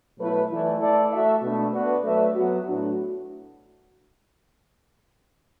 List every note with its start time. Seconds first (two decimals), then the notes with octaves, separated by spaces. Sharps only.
0.18 B2 F#3 A3 E4 B4
0.50 E3 A3 E4 D5
0.80 A3 E4 A4 D5
1.11 A3 F#4 A4 E5
1.42 B2 A3 D4
1.73 B3 D4 F#4 B4
2.04 F#3 A3 D4 B4 E5
2.35 F#3 B3 F#4
2.66 A2 F#3 D4 F#4